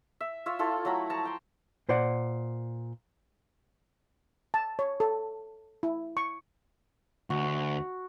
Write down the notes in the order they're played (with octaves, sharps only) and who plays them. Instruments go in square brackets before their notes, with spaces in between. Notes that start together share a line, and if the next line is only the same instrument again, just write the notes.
[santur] E5
F4 C#5 E5
E4 F4 A4 C#5
F#3 A3 A#5 B5
F3 A5 A#5 C#6
G5 C6
[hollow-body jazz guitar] A#2 C5 D5 F#5
[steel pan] A5
C#5
A4
E4
C#6
[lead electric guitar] D2 [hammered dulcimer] F#4